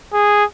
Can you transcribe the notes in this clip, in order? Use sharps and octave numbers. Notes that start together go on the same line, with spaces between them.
G#4